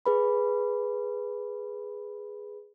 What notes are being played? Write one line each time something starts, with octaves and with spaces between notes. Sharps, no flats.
G#4 B4 B5